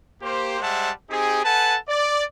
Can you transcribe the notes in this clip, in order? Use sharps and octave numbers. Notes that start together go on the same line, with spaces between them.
A#3 G4 C5
G3 G#3 C5 E5 F#5 A5
C4 D#4 G4 G#4
A4 B4 F#5 G#5 A5
D5